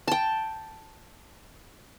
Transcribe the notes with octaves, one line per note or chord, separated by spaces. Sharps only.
G5 A5